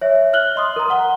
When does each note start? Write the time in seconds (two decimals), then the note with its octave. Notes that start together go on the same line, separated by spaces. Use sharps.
0.01 C#5 E5
0.33 F6 F#6 F#7 G7
0.56 D#5 C6 D#6
0.76 A#4 A#5
0.90 F#5 G7